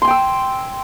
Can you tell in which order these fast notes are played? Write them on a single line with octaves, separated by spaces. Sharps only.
C6 G#5 G5 E6